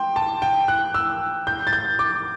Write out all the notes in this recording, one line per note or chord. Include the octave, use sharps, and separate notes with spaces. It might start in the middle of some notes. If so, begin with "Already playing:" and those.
Already playing: G5 C6
A5
G5
F#6
E6
G6
A6
G6
D6